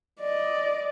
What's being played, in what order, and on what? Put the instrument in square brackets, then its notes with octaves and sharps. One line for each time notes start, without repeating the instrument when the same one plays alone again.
[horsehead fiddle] D5 D#5